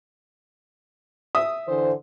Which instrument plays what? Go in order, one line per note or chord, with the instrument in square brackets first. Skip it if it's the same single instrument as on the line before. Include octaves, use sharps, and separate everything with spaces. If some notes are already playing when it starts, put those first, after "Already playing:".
[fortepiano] E5 D#6
[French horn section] D3 E3 C5